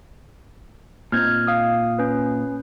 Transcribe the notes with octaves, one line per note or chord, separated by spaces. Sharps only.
A#2 C4 D#4 F6 G6 G#6
F5 D#6
C#4 B4